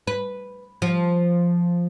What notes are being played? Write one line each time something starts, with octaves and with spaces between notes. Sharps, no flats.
B4
F3